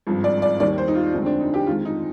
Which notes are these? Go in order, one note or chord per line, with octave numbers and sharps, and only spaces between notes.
G#1 G2 F3
D5
D5
D#2 D#3 G3 D5
C5
D#4
F4
F1 F2 D3 G#3 D#4
C4
D4
D#4
G4
F2 D#3 G#3 F4
D#4